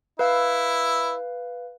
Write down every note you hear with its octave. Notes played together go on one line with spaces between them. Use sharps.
E4 B4 F5